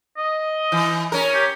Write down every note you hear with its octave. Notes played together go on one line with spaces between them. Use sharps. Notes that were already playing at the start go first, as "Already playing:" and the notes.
D#5
E3
C#4 A#4
G4